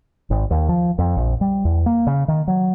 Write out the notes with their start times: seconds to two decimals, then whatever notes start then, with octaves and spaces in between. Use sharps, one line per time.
0.31 G#1
0.51 D#2
0.69 F3
0.98 F2
1.17 A#1
1.41 G3
1.65 E2
1.86 A#3
2.07 C#3
2.28 D#3
2.48 F#3